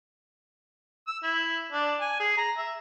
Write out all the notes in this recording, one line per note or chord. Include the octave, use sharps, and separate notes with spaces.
E6
E4
D4
G#5
G#4
A#5
E5